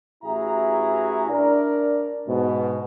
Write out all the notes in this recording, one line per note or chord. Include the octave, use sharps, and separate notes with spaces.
A1 E4 F#4 G#4 E5 A#5
D4 A#4 D5
G#2 B2